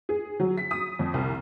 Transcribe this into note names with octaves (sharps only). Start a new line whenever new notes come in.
G#4
F#3
B6
D#6
F2
C2